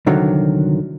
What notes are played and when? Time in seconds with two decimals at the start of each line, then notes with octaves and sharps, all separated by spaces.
0.06 C2 D3 D#3 F#3